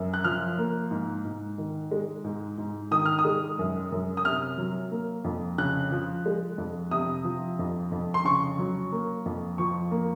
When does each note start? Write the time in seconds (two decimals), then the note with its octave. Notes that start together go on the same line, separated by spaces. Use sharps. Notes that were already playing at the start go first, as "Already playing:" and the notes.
Already playing: F#2
0.14 F#6
0.24 F3 F6
0.58 A#3
0.91 G#2
1.25 G#2
1.58 D#3
1.91 G#3
2.24 G#2
2.58 G#2
2.91 D#3 D#6
3.05 F6
3.19 D#6
3.25 G#3
3.59 F#2
3.92 F#2
4.17 D#6
4.25 C3 F6
4.58 F#3
4.91 A#3
5.24 F2
5.58 C#3 F#6
5.92 F3
6.26 G#3
6.58 F2
6.91 C3 D#6
7.24 F3
7.59 F2
7.92 F2
8.14 C6
8.25 C#3 C#6
8.59 F#3
8.92 A#3
9.26 F2
9.58 F3 C#6
9.91 A#3